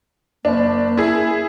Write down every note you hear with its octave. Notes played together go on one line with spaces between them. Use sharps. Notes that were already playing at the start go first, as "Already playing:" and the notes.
F#1 A#3 D4
E4 G#4